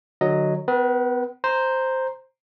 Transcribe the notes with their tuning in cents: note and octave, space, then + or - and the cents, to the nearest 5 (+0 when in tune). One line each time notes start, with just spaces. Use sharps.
D3 +35 F#3 +0 D#5 +0
B3 +35 B4 -30
C5 +0 A#5 +0